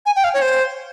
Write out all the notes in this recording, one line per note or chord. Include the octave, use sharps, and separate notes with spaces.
G#5
G5
F5
C#5
C5